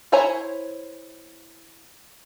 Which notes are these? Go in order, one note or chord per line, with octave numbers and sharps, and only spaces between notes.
E4 C5 C#5 G#5 A#5